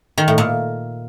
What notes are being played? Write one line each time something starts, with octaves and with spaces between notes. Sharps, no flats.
D#3
A2
A#2